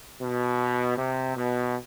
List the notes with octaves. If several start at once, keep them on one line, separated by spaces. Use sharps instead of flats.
B2
C3
B2